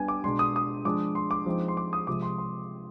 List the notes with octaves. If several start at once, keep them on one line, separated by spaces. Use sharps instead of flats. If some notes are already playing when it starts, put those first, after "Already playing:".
Already playing: G3 B3 D4 G#5
D6
B2 G#3 D4 C6
D#6
D#6
F3 G#3 D4 D6
C6
D6
F3 G#3 C4 D#4
C6
D6
D#6
C3 F3 G#3 D6
C6
C6